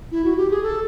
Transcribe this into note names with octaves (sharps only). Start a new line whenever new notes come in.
E4
F#4
G4
G#4
A4